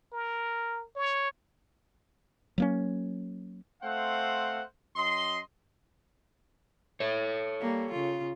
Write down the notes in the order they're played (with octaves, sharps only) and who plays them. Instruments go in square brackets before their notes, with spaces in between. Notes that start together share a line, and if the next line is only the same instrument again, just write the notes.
[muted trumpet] A#4
C#5
[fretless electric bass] F#3 A#3 C#4
[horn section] A3 C4 C5 F5 F#5
F#2 D#5 C6
[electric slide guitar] A4 C#5
[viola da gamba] G3 A#3
C#3 F4